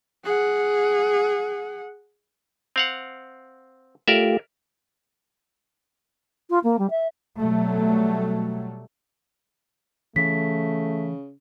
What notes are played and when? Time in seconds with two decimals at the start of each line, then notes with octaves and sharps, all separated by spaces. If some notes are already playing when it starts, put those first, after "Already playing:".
0.25 G#4 F#5
2.76 C4 F5 F#5
4.08 A3 F4 G4 A#4 D5 E5
6.50 F4
6.63 A#3
6.79 G3
6.90 E5
7.38 B2 F#3 G3 A3
10.16 C#3 E3 A3 B6